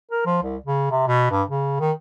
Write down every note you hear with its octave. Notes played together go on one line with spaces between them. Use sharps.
A#4
F3
C2
C#3
C3
B2
G2
C#3
D#3